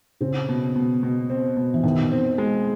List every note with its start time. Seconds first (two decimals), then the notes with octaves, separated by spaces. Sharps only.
0.21 C#3 C4
0.49 B2
0.76 B2
1.03 B2
1.30 C4
1.57 B2
1.74 E3
1.83 B2 D#3
2.11 C4
2.38 G#3